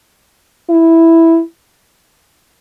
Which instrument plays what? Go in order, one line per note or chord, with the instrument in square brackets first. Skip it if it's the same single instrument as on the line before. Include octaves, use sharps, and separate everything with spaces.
[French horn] E4